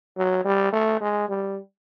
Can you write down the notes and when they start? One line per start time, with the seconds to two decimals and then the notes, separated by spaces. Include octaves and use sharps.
0.17 F#3
0.45 G3
0.73 A3
1.01 G#3
1.29 G3